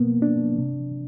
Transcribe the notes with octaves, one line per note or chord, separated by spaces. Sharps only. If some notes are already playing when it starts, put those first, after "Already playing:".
Already playing: B2 A#3 B3
D4
C3